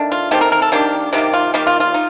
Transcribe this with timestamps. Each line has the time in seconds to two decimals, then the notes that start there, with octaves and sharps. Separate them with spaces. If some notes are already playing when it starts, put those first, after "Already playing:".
Already playing: D#3 A3 D4
0.12 F4
0.31 D#3 A3 C4 G4
0.41 A#4
0.52 A#4
0.62 A4
0.72 D#3 A#3 D4 G4
1.13 C3 D#3 G3 A#3 G4
1.33 F4
1.54 D#3 G3 A#3 G4
1.67 F4
1.80 F4
1.94 D#4